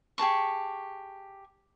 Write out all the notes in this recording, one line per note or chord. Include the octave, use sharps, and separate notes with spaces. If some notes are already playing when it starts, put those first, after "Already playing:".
G4 G#4 A5 C#6